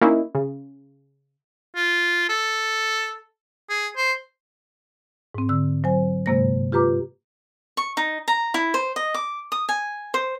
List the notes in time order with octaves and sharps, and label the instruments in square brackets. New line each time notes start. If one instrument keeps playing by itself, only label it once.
[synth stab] A#3 C#4 D#4 E4
C#3
[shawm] F4
A4
G#4
C5
[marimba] G#2 C4
D3 E6
F#3 C5 G#5
G2 C3 G#3 A#3 C5 A#6
F4 G4 B4 A#5 D6
[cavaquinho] C#6
D#4
A#5
E4
C5
D#5
D6
D#6
G#5
C5